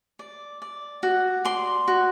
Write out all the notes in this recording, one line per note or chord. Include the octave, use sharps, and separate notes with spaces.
D5
D5
F#4
D5 C6
F#4